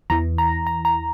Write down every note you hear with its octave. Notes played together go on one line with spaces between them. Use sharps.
E2 E3 A#5
A#5
A#5
A#5